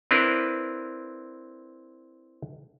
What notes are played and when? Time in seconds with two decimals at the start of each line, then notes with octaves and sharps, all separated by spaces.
0.11 C4 D4 E4 A#4 B4